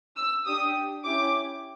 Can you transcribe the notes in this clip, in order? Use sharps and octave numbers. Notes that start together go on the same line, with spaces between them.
E6
D4 G4 D#6
C#4 E4 G4 D6